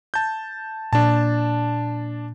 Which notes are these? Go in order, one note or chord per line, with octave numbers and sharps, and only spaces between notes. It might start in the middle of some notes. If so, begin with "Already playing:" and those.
A5 G6
A#2 D4 A5